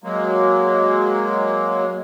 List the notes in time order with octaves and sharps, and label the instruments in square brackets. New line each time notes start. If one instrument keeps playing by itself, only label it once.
[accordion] F#3 G#3 A#3